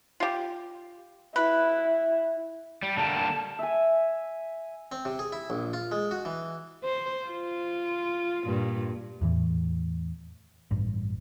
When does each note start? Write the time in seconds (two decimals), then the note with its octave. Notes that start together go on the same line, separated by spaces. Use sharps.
0.20 F4 G4
1.36 E4 B4
2.83 G3
2.97 D3 G3 A#3 A5
3.59 E5 G#5
4.92 C4
5.05 C3
5.19 G#4
5.32 E4
5.50 A#1
5.73 F4
5.92 G#3
6.11 F#4
6.25 E3
6.84 C5
7.26 F4
8.46 G2 A#2
9.21 E2 A2 E3
10.71 A1 G2